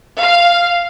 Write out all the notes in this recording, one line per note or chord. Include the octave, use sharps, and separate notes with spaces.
F5